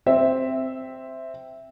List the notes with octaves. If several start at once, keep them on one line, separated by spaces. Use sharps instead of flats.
C4 E5